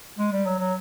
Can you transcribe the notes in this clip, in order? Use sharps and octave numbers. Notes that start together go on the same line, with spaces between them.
G#3
G3
F#3
F#3